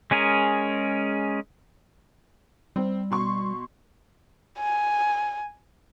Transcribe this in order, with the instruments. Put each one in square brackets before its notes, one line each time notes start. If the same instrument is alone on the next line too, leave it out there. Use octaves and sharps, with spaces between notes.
[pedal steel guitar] G#3 C#4 G#4 A#4
[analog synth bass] G3 [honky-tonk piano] C4
[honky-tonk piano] B2 C6 C#6
[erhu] G#5